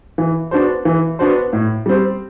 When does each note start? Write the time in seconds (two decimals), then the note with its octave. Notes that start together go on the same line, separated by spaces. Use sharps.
0.18 E3
0.51 B3 D4 F#4 C5
0.85 E3
1.19 B3 D4 F#4 C5
1.53 A2
1.86 G3 C4